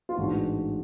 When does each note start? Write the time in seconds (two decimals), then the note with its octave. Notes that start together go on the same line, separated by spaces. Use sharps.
0.09 F4
0.17 A1 G#2 G#3 D4 F#4